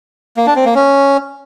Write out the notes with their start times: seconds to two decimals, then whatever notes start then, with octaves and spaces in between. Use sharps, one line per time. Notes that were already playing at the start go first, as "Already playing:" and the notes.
0.37 A#3
0.46 D4
0.56 C4
0.65 A#3
0.75 C#4